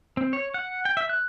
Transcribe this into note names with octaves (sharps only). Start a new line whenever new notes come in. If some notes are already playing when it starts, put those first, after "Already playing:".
C4
C#5
F#5
G5
E5
F#6